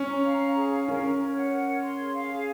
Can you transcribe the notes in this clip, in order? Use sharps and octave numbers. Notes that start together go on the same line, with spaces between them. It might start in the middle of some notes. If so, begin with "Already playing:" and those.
Already playing: C#4
A#5
F5
A#5
G#4
F5
C#4 A#4
A#4
C#5
F#5
A#4
C#5
C6
G#4
F5
G#4